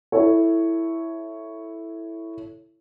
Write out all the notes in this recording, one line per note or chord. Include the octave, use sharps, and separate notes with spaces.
E4 A4 C#5